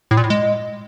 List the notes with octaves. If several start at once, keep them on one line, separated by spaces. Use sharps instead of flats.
A2
A#2
A2
G#3